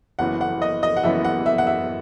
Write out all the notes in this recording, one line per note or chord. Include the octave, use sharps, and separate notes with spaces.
F#1 F#2 E3 B3 F#5
F#5
D#5
D#5
F#5
F#1 F#2 E3 B3 E5
F#5
E5
F#5
E5